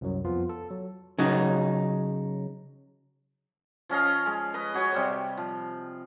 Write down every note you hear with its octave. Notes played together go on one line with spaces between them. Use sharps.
C2 F#2 F#3
F2 F3 B3 F4
A4
F#3
C#3 F#3 D#4
F3 C#4 D#5 F5
G#3
B4 D#5
F#4 G#4 C#5
C3 G3 C5
F3